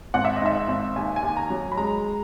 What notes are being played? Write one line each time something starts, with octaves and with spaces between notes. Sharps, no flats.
G#1 F#5
E5
D#5
G#2 E5
G#1
D#2 G#5
G#5
D#2
A#5
F#3
B5
G#3 A#5